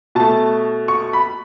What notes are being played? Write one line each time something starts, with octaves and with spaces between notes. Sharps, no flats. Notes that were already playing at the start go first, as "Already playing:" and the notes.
B2 A3 A5
C#6
B5